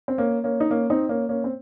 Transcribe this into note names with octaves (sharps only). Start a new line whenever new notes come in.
C4
A#3 C#4
A#3 C#4
D#4
A#3 C#4
C4 D#4
A#3 C#4
A#3 C#4
C4